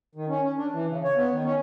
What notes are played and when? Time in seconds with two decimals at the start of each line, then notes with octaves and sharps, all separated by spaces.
0.15 D#3
0.29 C#4
0.42 C#4
0.57 D4
0.72 E3
0.89 C#3
1.04 C#5
1.16 B3
1.32 D#3
1.44 C#4